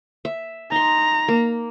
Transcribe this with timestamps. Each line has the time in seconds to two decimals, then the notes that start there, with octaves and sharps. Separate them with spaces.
0.25 E5
0.72 D#4 A#5 C6
1.28 A#3